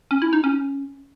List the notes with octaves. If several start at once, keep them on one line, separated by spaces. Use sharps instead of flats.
C#4
E4
D#4
C#4